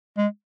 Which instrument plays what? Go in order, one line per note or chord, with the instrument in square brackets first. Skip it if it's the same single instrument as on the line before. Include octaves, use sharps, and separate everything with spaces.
[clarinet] G#3